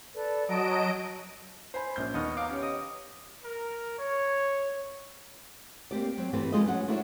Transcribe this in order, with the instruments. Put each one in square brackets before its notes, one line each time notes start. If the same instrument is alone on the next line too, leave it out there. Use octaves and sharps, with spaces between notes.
[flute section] A4 B4 D5
[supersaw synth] F#3 D#5 D7 [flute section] A5
[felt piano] C5 G#5 B5
A#1 C#4 G6
[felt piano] D#2 C#6 F6 [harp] B3 D#5
[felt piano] F5 A#5 [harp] D6
[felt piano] C#4 G4 C#5
[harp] D#5
[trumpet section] A#4
C#5
[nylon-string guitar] A#3 C4 G4 D5
F#3 C4
E2 G2 E3 G3 A3 C4
F3 G#3 A3 F4 G#4 D#5
F#3 C#4 F#5
A3 D4 E4 F#4 B4 C#5